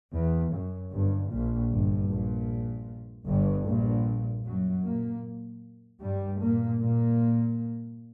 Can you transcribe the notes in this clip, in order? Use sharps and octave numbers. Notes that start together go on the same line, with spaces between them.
E2
F#2
G1 G2
A#1 A#2
G1 G2
A#1 A#2
G1 G2
A#1 A#2
F#2 F#3
A#2 A#3
G2 G3
A#2 A#3
A#2 A#3